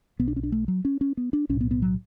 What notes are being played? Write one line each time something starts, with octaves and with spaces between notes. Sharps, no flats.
B1 B2 B3
D4
C#4
D4
A3
F#3
C#4
C#4
B3
D4
B1 A2 C#4
B3
B3
F#3